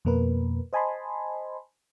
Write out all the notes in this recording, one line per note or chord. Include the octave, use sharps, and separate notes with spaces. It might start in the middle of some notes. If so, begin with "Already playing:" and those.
F2 B2 A#3 A#4 B4
C5 D#5 G#5 A5 B5 C6